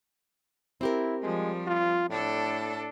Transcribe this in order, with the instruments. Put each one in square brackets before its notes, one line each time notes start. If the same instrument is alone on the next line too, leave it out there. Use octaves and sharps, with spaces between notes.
[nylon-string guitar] C4 G4 A#4 [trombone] E4
[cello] F3 G3 [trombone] G#3
[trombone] F4
[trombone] A2 [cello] D4 A4